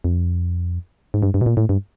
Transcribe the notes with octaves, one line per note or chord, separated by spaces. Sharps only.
F2
G#2
G2
G2
B2
A#2
A2
G2